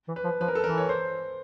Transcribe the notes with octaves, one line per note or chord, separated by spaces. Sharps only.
E3
B4
F3
F3 B4
A#4
A4
E3 A#4
C#5
C5